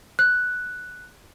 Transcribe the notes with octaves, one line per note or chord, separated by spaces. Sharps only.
F#6